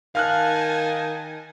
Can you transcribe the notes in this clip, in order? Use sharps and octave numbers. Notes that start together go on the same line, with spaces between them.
D#3 F5 G#5 A5 F6 F#6